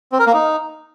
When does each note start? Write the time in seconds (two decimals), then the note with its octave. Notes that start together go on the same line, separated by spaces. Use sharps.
0.12 C4
0.19 A#4
0.26 A#3
0.34 D#4